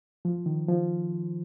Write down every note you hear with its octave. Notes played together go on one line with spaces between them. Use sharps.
F3
D#3
F3